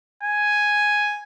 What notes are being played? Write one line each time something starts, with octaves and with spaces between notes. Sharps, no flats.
G#5